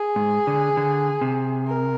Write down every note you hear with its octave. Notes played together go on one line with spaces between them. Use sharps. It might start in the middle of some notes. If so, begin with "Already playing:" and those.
Already playing: G#4
G#2
D3
D3
C3
A#4